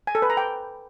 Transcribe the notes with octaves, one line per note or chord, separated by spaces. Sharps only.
G#5
A4
B4
A#5
G5